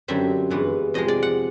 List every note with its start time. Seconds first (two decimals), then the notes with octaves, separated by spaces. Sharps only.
0.08 F#2 D3 G3 C4 E5
0.50 G2 E3 G#3 B3
0.94 F2 C3 F3 G#3 D#5
1.08 D5
1.23 F#5